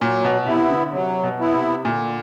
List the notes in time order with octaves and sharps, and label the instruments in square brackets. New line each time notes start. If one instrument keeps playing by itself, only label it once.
[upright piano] A#2 [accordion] F#3
[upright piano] B2
[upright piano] C3 [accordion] B3 E4
[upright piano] D3
[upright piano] C3 [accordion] F#3
[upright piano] B2
[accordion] B3 E4
[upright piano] C3
[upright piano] A#2 [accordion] D3